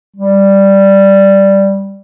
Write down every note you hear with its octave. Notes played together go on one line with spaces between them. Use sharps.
G3